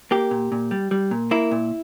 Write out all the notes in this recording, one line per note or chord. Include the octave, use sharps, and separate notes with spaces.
A#3 G4
A#2
A#2
G3
G3
A#2
A#3 E4
A#2